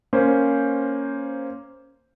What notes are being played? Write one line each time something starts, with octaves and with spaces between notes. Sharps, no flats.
A#3 C#4 C5